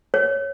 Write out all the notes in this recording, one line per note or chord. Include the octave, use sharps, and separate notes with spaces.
C#5